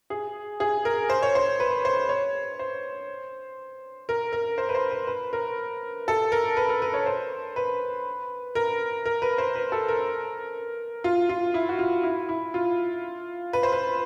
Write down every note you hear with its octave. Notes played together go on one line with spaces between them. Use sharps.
G#4
G#4
A#4
C5
C#5
C5
B4
C5
C#5
C5
A#4
A#4
C5
B4
C5
B4
B4
A#4
A4
A#4
B4
A#4
B4
C#5
C5
B4
A#4
A#4
B4
C5
B4
A4
A#4
F4
F4
E4
F#4
F4
E4
E4
F4
B4
C5
B4